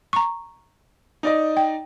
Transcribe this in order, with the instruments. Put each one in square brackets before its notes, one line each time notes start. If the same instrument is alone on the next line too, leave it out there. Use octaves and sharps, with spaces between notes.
[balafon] A#5 C#6
[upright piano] D#4 D5 D#5
[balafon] G5